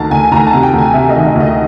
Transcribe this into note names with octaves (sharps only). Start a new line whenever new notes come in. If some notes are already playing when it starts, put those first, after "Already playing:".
Already playing: D2 D#3 A5 A#5
D2 G#5
D2 A#5
A5
C3
G5
D2
G#5
C3 E5
D#5
D#3
D#5
D2 D#5